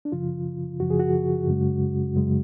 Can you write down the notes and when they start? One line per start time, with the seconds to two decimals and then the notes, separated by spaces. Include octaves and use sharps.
0.05 D4
0.12 F#2 C#3 F3 F4
0.80 F#2 C#3 F3 F#4
0.90 G#4
1.00 F#4
1.48 F#2 C#3 G#3
2.15 F#2 C#3 G#3